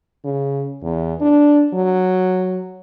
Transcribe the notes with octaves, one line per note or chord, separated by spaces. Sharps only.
C#3
E2
D4
F#3